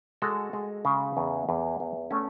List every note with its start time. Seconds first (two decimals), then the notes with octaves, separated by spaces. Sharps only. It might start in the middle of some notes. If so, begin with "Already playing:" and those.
0.22 G#3 F#4 A4
0.53 G#3
0.85 C#3
1.17 E2
1.49 E2
1.80 E2
2.11 A3 C#4